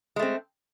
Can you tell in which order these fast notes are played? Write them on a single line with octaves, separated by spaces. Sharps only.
G#3 A3 C4